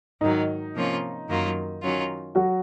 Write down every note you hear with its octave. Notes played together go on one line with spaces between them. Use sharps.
G#2 D#3 F#3 D#4
C3 F3 A#3 C#4 F4
F#2 D#3 F#3 A#3 F4
D#3 F#3 C#4 F4
F#3 F#4